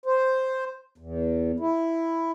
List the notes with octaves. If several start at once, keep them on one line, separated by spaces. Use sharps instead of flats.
C5
E2
E4